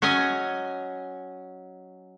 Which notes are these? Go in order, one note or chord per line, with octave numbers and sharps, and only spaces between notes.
F#3 C#4 D#5 G#5